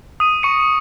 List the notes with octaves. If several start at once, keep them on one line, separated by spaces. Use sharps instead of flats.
D#6 D#7
C#6 C#7